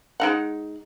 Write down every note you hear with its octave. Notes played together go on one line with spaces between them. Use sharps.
G#3 D#4 F#5